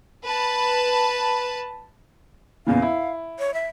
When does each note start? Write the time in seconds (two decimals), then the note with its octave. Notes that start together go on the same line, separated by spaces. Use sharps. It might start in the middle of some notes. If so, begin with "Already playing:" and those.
0.23 B4 A5
2.66 E2 A#2 C#3 F5
2.82 E4
3.39 C#5
3.54 E5